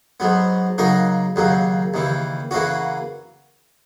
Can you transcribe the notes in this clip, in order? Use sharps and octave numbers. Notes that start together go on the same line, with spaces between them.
G#2 F#3 B3
C#3 F#3 A#3 D#4 A#4
D#2 C#3 F#3 A#3
D#2 C#3 E3
C#3 E3 A#3 C#4 F#4